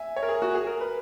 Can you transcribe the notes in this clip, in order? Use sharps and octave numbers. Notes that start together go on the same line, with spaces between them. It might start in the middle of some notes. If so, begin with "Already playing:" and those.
Already playing: E5 G#5
C#5
A#4
G#4
F#4
G#4
A#4
B4